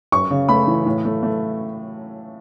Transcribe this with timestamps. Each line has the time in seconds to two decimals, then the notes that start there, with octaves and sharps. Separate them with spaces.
0.12 F#2 C#6
0.31 C#3
0.49 A3 B5
0.67 E3
0.86 A2
1.05 A3
1.23 A3